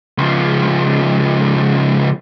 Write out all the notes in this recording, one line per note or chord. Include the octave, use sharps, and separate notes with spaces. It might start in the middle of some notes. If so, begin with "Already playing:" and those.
C#2 F3